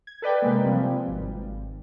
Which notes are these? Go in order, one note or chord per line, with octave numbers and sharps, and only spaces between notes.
G#6
A4 B4 D5 G5
C3 G#3 A#3
C3 F3 G3 C4
G#1